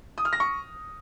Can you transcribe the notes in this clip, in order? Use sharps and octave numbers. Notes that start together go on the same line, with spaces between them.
D#6
F6
A#6
C#6